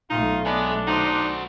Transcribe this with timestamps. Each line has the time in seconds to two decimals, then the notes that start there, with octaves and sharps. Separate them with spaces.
0.10 B1 A3 D#4 F4
0.45 B3 D4 G#4 D#5
0.87 D#4 F#4 C5